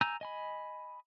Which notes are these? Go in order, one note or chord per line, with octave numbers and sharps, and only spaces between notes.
G#5 A#5 E6 G6
D#5 G#5 B5